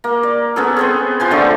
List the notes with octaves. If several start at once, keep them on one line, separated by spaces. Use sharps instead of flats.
A#3
D5
B3 C#4 G#4 A4
B3 C4 G#4
F3 C5 G#5
D3 A3 C#4 C#6